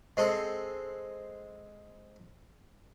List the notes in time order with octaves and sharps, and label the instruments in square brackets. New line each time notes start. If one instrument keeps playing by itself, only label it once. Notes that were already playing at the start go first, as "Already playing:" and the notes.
[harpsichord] G#3 C4 A4